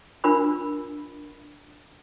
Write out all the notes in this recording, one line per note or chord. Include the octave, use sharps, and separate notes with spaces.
D4 F4 A#4 B5 E6